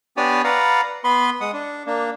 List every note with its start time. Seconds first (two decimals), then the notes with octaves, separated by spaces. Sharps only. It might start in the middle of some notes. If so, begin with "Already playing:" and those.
0.17 B3 D4 G4 C#5 D5 G#5
0.44 B4 D5 F5 F#5 A#5
1.04 B3 B4 B5 C6
1.41 G#3 F#5 D#6
1.53 D4
1.87 A#3 D4